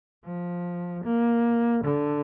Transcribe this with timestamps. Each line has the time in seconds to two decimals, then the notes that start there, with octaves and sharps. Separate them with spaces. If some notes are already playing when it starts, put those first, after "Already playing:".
0.25 F3
1.03 A#3
1.84 D3